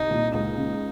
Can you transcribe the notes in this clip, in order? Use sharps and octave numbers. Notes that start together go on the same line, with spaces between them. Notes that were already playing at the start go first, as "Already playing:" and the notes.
Already playing: C2 D#4
A#2
C#2 D#4
C#3